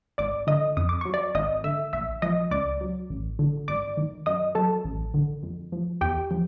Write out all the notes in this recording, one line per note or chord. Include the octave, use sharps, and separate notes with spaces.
G#1 D5 D6
D3 D#5 D#6
F2 D#6
D6
F#3 C#6
D5 D6
G#1 D#5 D#6
D3 E5 E6
A#1 E5 E6
F3 D#5 D#6
C#2 D5 D6
F#3
A1
D3
G#1 D5 D6
D#3
F#2 D#5 D#6
F#3 A4 A5
A1
D3
F2
F3
E2 G4 G5
F3